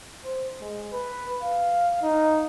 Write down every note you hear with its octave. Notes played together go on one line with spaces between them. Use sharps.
C5
G#3
B4
F5
D#4